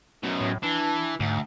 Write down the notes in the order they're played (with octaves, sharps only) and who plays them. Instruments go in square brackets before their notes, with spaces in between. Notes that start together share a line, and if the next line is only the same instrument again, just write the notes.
[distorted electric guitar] F#2 B2
[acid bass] A2
[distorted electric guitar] E3 [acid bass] D4
[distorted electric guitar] D2 [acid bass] G#2